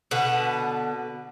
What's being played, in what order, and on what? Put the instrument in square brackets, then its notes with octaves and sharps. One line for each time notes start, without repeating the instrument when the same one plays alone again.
[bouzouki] B2 D3 B4 F#5